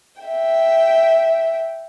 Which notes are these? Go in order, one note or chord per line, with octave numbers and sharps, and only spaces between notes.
E5 G5